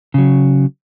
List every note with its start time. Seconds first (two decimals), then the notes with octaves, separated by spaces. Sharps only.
0.14 C#3 F#3